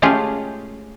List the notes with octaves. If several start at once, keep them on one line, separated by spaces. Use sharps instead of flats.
G#3 A3 C#4 F4 G4 G#4